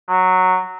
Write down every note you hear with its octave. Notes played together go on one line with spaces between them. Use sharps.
F#3